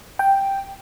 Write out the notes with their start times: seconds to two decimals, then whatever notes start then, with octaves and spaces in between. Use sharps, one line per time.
0.19 G5